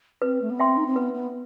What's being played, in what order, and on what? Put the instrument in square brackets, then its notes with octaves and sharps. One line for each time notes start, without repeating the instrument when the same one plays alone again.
[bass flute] C4 [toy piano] B4
[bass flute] A3
B3
[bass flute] C4 [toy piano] E5 G5 C6
[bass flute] D#4
C4
[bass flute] B3 [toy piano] B4
[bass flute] B3